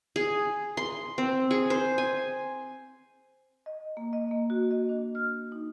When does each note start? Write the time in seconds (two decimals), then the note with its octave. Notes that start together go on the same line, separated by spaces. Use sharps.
0.16 G#4
0.77 C6
1.18 C4
1.51 G#4
1.70 C5
1.98 G#5
3.66 D#5
3.97 A#3
4.13 D#5
4.31 A#3
4.50 F#4
4.71 D#5
4.89 D4
5.15 F6
5.52 D#4